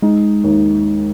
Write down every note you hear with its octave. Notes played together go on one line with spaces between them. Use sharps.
G#3 D#4
D#2